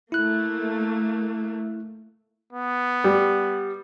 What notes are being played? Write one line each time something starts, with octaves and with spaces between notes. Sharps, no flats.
A3 A#3 E4 F#6
B3
G3